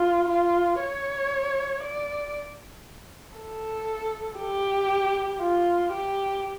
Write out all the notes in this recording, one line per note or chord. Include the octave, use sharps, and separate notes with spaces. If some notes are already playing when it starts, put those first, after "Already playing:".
Already playing: F4
F4
C#5
D5
A4
G4
F4
G4